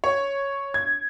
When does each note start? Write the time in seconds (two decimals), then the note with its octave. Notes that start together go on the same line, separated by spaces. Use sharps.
0.04 C#5
0.74 G#6